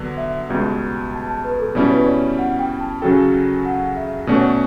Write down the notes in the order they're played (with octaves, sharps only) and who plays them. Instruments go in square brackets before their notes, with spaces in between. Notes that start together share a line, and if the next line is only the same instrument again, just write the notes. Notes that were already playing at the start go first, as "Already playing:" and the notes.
Already playing: [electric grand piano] D3 F#3 B3
[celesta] E5
[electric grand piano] C#2 B2 G3
[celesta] A5
A5
B4
A4
[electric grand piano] B2 G3 C#4 E4 [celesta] D5
[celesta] C#5
B4
C#5
D5
F#5
G5
A5
[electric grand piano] C#3 F#3 C#4 F#4 A4 [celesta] G5
[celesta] F#5
E5
[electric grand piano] B2 A3 C#4 F#4 [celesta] D5
[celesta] C#5
D5